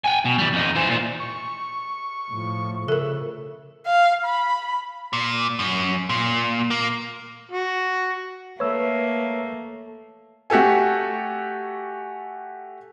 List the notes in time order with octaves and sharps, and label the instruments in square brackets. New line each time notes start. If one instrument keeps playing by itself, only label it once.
[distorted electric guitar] G5 G#5
B2
E3 G3
F2 D#4
E3 C5
A#2 F4
[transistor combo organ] C#6
[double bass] A2 F3
[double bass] C#3 [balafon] A4 A#4 [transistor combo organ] E5
[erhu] F5
B5
[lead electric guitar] A#2
F#2
A#2
A#3
[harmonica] F#4
[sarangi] A3 [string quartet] A#3 [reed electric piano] B4 E6 [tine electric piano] C#5
[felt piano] A3 F#4 G4 A4 G#5